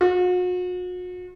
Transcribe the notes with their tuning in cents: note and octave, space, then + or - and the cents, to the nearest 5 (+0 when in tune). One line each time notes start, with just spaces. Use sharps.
F#4 -40